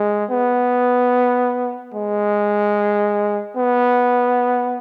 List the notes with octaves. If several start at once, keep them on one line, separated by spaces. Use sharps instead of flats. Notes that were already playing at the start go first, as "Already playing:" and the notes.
Already playing: G#3
B3
G#3
B3